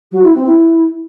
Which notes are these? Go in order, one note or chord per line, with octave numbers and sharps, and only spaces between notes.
F#3
E4
C4
E4